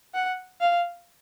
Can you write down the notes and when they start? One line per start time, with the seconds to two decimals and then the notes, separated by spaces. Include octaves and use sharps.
0.14 F#5
0.61 F5